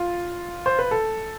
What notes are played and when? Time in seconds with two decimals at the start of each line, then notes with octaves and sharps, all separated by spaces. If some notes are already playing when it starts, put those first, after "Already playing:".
Already playing: F4
0.66 C5
0.79 B4
0.91 A4